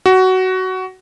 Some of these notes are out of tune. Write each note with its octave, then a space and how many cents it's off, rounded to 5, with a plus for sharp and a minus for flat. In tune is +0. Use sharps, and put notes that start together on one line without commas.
F#4 +15